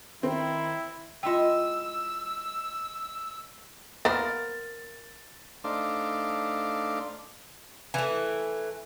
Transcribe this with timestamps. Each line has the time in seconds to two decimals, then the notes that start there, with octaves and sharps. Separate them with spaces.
0.23 D#3 C4 E4
1.23 G#3 E4 F4 D#5 G5 E6
4.05 A#3 B3 A#4 C5 A6
5.64 A3 D4 D#4 C5 D5 F5
7.94 E3 A3